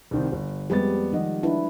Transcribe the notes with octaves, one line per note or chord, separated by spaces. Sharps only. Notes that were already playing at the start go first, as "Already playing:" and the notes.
C2 D#3 C4
G1
F2 G3 G#3 B3 G4 A6
D#3 F3 D#5 F#5
D4 E4 B4